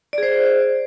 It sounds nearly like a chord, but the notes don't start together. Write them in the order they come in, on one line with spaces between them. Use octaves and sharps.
D5 G#4 C5